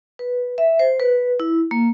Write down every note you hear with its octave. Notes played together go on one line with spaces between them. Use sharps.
B4
E5
C5
B4
E4
A#3